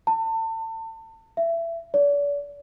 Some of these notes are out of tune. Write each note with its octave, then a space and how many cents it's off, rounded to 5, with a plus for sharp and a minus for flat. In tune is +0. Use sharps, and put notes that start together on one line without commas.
A5 +35
E5 +25
D5 -40